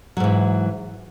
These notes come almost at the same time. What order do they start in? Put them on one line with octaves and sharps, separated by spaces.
F#3 G#2 E3